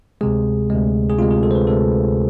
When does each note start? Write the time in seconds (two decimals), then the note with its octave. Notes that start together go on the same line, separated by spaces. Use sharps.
0.21 D2 C3 G#3 G#4
0.70 D2 C3 G#3
1.10 G#4
1.18 D2 C3 G#3 F4
1.31 G#4
1.43 A4
1.51 C5
1.55 B4
1.67 D2 C3 G#3 A4